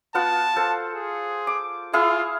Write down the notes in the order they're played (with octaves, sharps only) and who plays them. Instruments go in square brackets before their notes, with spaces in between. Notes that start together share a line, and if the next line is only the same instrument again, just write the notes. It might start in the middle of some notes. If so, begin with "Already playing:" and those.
[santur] B3 F4 F#5 [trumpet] A5
[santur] A4 C5
[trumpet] G#4
[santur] D6
[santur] E4 G#4 F5 [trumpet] F4